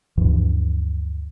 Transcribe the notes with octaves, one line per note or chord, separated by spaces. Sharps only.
D2 G2 E3 F3